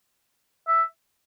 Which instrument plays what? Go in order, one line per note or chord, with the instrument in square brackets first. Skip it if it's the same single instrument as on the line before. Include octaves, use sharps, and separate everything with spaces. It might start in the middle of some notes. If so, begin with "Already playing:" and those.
[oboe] E5